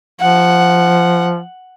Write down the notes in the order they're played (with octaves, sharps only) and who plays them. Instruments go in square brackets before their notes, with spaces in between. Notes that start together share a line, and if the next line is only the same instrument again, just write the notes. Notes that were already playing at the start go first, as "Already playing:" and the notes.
[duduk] F3 [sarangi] F#5